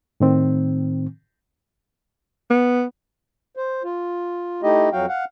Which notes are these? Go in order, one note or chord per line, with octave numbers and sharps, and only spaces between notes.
A2 D#3 C4
B3
C5
F4
A3 D#4 E4 G4 D#5
F2 F#3 F#4 F5 G5
F5 F#5